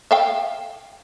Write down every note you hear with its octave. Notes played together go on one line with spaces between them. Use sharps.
E5 F5 G5